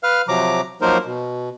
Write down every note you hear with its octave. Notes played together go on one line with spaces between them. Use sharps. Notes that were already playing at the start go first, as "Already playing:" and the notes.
B4 F5 F6
C3 F3 F#3 A#5 D6
F3 F#3 A#3 D#4 A#4 C5
B2